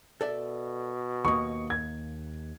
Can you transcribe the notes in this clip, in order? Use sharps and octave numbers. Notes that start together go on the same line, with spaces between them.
B2 A4 D5 E5
D#2 A#3 C#6 D#6
G#6